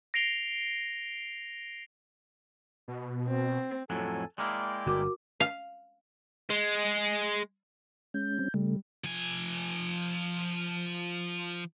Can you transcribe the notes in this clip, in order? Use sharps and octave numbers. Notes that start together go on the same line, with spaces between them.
A#6 C7 D7 F7 G7
B2
C4
F2 A2 F#3 A4 G#5
G#3 A#3 E4 D5 G5
G1 G2 F#4 A#4 D6
F5
G#3
G#3 C#4 G6
G3 C4 C#4
C#3 G3 A3
F3 G#5